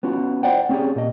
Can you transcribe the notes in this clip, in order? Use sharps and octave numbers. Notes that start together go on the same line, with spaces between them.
B3 C#4 F4 F#4
C5 D5 F#5 G5
C4 C#4 G4 G#4 D5
A#2 G4 D#5